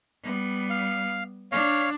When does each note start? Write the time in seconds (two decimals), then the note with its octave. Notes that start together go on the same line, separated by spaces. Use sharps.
0.23 G3 B3
0.70 F5
1.52 D4 C#5 F5